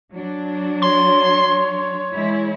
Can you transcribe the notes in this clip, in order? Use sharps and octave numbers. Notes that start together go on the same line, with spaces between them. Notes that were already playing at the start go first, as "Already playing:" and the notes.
F#3 D4
C#5 C6
E3 G#3 E4